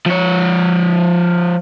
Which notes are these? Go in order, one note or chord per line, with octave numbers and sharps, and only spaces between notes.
F3 C#5